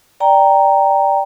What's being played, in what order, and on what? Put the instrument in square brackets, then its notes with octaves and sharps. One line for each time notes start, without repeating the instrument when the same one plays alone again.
[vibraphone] D5 G5 A#5